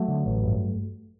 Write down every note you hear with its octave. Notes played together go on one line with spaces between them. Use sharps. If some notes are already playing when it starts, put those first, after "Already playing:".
Already playing: F#3 A3
D3
A1
G2